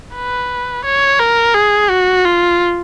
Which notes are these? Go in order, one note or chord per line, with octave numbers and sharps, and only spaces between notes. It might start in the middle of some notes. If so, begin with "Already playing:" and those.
B4
C#5
A#4
G#4
F#4
F4